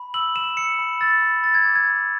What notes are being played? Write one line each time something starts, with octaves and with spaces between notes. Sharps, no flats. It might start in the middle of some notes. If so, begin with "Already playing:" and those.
Already playing: B5
E6 F#7
E6 E7
E6 C#7
B5
E6 A6
B5
B5 A6
G#6
D6
G#6
B5